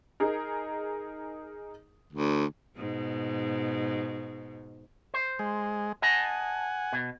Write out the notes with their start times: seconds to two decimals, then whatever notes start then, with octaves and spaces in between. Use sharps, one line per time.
0.20 D#4 G#4 A#4
2.13 D2
2.76 G#2 B2
5.14 C5
5.39 G#3
6.02 D#5 F#5 G#5 A5
6.93 B2